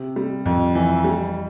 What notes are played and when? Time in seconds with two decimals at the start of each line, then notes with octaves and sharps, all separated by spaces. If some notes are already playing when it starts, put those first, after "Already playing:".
Already playing: C3
0.16 G3
0.46 F2
0.75 E3
1.04 G3